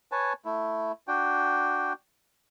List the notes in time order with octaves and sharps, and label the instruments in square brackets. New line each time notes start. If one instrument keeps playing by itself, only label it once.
[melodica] B4 C#5 G#5 A5
A3 E4
D4 F#4 G5